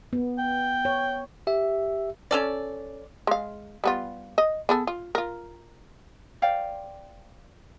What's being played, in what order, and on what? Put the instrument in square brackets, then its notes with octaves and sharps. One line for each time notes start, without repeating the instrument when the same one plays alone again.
[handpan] B3
[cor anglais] G5
[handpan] C#5
[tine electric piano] G4 E5
[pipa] C#4 A4 D5
[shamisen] G#3 F5
G3 B3 F4
D#5
B3 G#4 A4
F4
F4 A#4
[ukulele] C5 D5 F5 G5